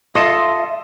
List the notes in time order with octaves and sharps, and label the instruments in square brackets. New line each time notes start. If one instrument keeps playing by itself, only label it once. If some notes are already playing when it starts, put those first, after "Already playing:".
[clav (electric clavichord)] F4 A4 [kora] D#5 [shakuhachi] E5 [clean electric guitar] C6